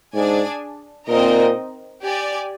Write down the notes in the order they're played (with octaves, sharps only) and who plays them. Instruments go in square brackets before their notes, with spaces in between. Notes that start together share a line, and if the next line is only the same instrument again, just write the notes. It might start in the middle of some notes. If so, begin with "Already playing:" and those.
[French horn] G#2 [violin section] D4 G#4 D5 G#5
[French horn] A#2 [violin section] C4 D#4 A#4 D#5
[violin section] G4 D5 G#5